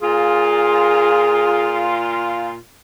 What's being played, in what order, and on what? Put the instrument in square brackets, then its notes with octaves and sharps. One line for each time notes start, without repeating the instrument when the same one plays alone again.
[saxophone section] A#2 F4 [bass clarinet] G#4